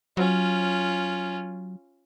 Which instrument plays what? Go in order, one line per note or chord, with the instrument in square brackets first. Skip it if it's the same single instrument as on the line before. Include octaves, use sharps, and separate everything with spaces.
[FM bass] F#3 [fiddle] C#4 F4